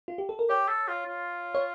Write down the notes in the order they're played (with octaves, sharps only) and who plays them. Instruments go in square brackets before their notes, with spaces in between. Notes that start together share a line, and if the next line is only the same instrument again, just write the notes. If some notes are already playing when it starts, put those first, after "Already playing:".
[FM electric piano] F4
G4
A4
A#4
[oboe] G4 [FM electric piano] C#5
[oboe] A4
F4
F4
[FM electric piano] C#5